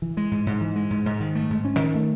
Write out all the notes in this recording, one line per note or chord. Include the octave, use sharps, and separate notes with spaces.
E3
G#3
G#2
G#2
E3
G#3
G#2
G#2
D#3
A3
G#2
C#4
D#3
A3